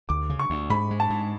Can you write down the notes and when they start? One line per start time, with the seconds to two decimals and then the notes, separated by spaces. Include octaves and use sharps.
0.09 D2 D6
0.30 C#3
0.39 C#6
0.50 D2
0.70 G#2 B5
0.91 G#3
1.00 A5
1.10 G#2